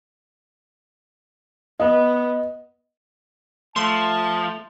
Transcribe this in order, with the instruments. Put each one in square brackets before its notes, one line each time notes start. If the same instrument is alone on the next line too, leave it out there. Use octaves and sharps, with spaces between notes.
[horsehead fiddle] B3 [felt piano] D#5
[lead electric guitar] F3 [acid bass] A3 [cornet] A5 [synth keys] C6